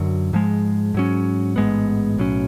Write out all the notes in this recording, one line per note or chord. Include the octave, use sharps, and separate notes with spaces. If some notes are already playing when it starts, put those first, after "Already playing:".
Already playing: F#2 D3 F#3
G#2 F3 G#3
G#2 F#3 C#4
A1 G#2 G#3 B3
B1 A2 F#3 C#4